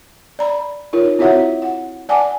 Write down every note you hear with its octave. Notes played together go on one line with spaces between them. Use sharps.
D5 A#5 B5
D#4 F4 A#4 C#5
C4 E4 F#4 C#5 E5 F#5
F#5
D5 F#5 G#5 A5 D6